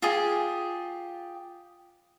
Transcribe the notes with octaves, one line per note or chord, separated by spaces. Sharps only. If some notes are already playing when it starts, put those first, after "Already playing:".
F4 G4 G#4 G#5